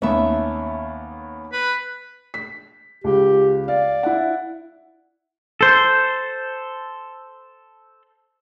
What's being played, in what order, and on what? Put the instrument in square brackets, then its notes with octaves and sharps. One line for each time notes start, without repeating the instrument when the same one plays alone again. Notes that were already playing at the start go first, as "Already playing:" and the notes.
[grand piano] D#2 B3 C#4 [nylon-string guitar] A3 E5
[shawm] B4
[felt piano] B6
[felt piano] C#2 [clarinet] G4
[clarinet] D5 [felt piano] F5
[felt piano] E4 F#5
[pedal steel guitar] A4 C5